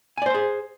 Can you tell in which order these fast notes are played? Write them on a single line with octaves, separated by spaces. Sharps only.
G#5 D5 C5 C6 G#4